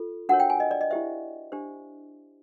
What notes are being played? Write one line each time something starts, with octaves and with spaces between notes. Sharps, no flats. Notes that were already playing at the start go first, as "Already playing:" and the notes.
Already playing: F4 A4
D4 F#4 A#4 C#5 F#5
G5
G#5
D#5
D5
D#5
E4 G4 C5 E5
D4 G4 C5